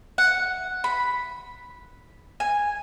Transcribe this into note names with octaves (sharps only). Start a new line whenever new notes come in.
F#5
B5
G#5